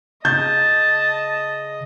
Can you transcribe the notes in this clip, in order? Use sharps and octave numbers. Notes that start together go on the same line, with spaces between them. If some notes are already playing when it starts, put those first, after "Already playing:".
C#3 D#5 A5 G6